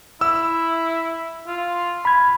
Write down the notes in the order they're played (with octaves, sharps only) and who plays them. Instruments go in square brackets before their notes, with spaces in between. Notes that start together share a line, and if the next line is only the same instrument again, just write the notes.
[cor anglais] E4 [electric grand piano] E6
[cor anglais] F4
[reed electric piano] B5 G#6